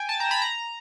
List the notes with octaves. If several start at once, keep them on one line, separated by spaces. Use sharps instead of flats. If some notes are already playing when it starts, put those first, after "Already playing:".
Already playing: G5 G#5
A5
A#5
B5
A#5